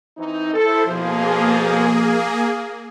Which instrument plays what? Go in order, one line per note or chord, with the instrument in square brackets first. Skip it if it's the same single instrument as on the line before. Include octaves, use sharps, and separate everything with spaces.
[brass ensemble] E3 C4 D#4
[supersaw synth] E4 C5 [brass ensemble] A4
[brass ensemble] F2 B2 F3 [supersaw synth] A#3 G#4